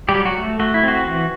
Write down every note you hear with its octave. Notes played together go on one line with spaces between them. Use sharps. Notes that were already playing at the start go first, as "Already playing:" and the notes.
G3 G4
F#3
F#4
A3
A3 F#4
E4
C4 F#4
E3